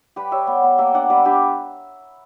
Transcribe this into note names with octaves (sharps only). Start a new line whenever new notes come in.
G3 G4 B4
G3 C#5 E5
B3
B3
A#3 E5 G5
D4 D5 F#5
G3 B4 D5
D4 G4 B4